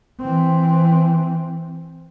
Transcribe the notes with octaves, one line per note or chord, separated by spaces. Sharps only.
E3 C4